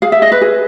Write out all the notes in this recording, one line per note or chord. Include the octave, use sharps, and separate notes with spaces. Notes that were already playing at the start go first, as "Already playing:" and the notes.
G#4 F5
E5
G#4 D#5
B4
G#4